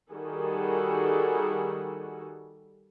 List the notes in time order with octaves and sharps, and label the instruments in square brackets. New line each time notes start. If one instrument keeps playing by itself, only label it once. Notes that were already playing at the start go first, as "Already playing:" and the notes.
[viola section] D#3 G3 F#4 G#4 A4